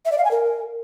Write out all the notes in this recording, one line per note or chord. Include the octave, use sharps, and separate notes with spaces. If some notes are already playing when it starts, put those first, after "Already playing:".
E5
D5
F5
G#5
A#4